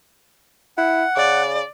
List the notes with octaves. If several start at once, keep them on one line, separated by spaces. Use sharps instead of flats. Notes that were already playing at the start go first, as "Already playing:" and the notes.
E4 F#5
C#3 D5